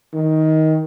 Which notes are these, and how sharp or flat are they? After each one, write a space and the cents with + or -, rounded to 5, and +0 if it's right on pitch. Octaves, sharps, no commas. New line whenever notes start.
D#3 +15